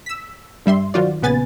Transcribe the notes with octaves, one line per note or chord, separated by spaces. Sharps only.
E6 B6
G2 G3 E5 C6
D#3 F#3 F4 F#4 C5 D5
A#1 C#3 B3 B4 G#5 A6